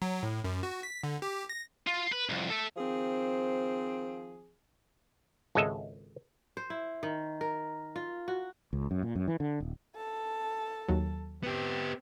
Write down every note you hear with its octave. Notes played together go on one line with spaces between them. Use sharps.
F#3
A2
F#2
F#4
B6
D3
G4
A#6
F4
B4
C2 F2
A4 E5
D#3 F3 C4 G#4
G#1 C#2 G#3 A4 D#5 E5
C5
E4
D#3
A#4
F4
F#4
C#2
F#2
A#2
F#2
E3
D3
D#1
A4 A5
D#2 F#3
B3 C4 G4